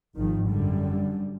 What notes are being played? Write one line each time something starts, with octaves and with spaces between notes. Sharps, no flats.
G#1 G#2 D#3 F3
F#2 D3 G3